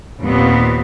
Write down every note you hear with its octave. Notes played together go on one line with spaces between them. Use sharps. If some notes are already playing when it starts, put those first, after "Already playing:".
D#2 A#2 B3 C4